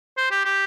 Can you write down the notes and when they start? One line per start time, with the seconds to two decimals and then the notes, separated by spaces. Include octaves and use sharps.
0.18 C5
0.31 G4
0.45 G4